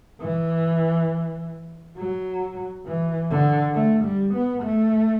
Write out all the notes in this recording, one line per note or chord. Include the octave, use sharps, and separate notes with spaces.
E3
F#3
E3
D3
A3
G3
B3
A3